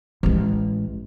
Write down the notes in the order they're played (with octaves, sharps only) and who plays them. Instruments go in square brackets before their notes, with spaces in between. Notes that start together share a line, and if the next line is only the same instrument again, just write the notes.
[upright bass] A1 G#3